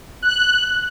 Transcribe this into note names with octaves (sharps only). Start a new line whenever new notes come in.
F#6